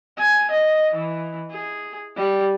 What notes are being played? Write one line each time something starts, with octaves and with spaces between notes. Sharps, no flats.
G#5
D#5
E3
G#4
G3